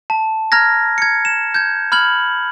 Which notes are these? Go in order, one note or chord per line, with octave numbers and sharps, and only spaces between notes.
A5
A#5 F6 G#6 A#6
G#6 C#7
E7
G6 G#6
B5 F6 G#6 F#7